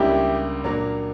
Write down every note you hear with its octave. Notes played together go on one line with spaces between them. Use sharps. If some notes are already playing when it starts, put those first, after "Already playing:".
Already playing: C#2 C#3 G3 A#3 D4 E4 G4
A#2 F#3 A#3 D4